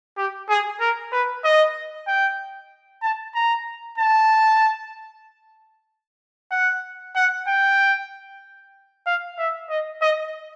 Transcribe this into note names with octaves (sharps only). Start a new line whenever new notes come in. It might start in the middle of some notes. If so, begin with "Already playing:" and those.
G4
G#4
A#4
B4
D#5
G5
A5
A#5
A5
F#5
F#5
G5
F5
E5
D#5
D#5